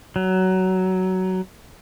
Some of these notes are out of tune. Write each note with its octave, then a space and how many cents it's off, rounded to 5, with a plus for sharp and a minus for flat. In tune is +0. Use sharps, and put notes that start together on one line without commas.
F#3 +15